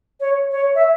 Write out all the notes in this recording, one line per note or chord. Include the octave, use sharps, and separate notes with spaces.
C#5
C#5
E5